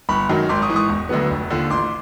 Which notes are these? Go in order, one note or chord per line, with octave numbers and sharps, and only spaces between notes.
G1 B5 C#6
F#2 D#3 F#3
G#1 C6 D6
C#6 D#6
G#2 E3
C#6 D#6
E1
D2 D3 F#3 B3
F1
D#2 D3 F3
A1 C6 D6